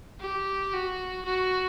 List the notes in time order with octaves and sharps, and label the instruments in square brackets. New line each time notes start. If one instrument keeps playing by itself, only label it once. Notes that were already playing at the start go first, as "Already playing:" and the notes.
[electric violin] G4
F#4
F#4